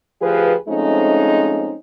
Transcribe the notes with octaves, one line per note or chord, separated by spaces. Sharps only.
D2 F3 G4 G#4 B4
F3 G#3 A3 C4 C#4 D#4